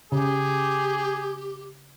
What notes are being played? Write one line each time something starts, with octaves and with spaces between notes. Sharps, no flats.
C#3 G4 G#4